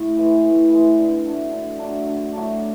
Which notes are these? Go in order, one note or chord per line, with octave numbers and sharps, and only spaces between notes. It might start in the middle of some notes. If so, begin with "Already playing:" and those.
Already playing: A2
E3 G#3
A2
E3 G#3
D3
F#3 A3 D4
D3
F#3 A3 D4
D3
F#3 A3 D4